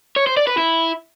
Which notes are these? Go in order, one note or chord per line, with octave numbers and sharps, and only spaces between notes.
C#5
C5
D5
B4
E4